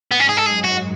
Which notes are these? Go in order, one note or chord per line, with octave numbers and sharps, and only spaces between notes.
G#2 G#3 B3
C#4
G#4
A4
F#2 F#3 G#4
F#4